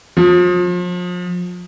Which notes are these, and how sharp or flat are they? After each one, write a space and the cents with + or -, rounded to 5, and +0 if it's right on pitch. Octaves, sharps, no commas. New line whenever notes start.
F3 +35